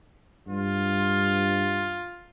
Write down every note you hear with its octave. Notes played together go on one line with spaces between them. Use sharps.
G2 F4